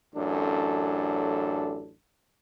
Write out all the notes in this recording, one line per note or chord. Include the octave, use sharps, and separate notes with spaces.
A1 F#2 D4 A4